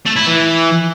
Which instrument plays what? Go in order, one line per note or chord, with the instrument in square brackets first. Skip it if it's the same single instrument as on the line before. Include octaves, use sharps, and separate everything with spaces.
[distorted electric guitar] A3
E4
E3